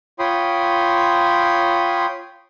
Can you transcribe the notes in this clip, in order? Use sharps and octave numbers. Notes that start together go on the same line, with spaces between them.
F4 C#5 G5 B5 C6 D#6